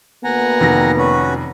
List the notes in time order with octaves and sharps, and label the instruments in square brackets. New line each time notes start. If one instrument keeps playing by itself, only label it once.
[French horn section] D2 A#3 B3 [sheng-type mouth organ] F#5 G#5 A#5
[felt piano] F1 D#3 A#6
[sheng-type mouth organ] C#4 F#4 B4